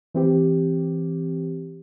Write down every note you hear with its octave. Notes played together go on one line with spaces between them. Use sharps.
E3 C4 G4